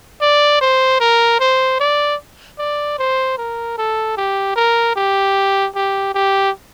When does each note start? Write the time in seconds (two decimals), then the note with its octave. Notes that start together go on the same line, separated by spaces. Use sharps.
0.21 D5
0.61 C5
1.00 A#4
1.40 C5
1.80 D5
2.59 D5
2.98 C5
3.38 A#4
3.78 A4
4.17 G4
4.56 A#4
4.96 G4
5.75 G4
6.15 G4